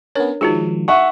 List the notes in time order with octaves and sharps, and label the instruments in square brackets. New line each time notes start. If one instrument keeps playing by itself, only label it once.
[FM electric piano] B3 C#4 [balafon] D4 A#4 C#5
[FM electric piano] D#3 F3 G#3 [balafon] D#4 F#4 G#4
[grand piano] E5 F#5 C#6